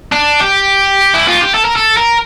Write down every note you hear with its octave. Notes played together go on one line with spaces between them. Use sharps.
D4
G4
E4
F4
G4
A4
A#4
A4
A#4